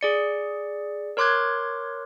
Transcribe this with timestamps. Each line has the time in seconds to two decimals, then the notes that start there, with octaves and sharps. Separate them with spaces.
0.01 G#4 D5 C#7
1.17 A#4 C#5 C6 D6 F#6 G#6